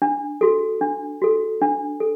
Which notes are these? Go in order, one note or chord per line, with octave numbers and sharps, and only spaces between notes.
D4
F#4 A4
D4
F#4 A4
D4
A4